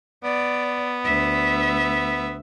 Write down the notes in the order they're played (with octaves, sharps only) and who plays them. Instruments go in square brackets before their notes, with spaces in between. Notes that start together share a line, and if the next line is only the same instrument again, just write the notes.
[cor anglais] B3 [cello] D5
[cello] D2 E5